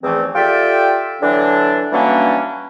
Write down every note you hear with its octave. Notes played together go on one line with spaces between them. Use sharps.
E2 G#2 E3 F3 A3 C4
F4 G4 A4 D5 E5 G5
D3 E3 F#3 D4
E3 F#3 G3 A#3 C#4 D4